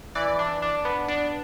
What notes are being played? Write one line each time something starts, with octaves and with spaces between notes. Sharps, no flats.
E3 D5
D4
D4
B3
D4